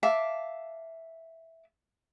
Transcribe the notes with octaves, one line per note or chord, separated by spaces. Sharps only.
E5 F5 A5 D6